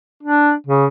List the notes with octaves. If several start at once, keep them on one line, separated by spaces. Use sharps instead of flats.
D4
C#3